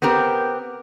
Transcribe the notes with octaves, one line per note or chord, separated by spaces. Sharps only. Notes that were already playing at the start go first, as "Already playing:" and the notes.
B3 C4 G4 A#4